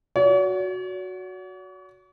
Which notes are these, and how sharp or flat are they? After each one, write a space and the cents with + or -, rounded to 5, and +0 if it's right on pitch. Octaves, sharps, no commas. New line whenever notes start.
F#4 -5 C#5 +45